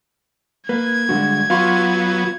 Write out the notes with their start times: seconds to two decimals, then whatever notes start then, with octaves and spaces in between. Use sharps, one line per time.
0.69 A#3 B4 G#6
1.09 G2 D3 G#3 F#4
1.50 F#3 B3 F4 F5 C6 C#6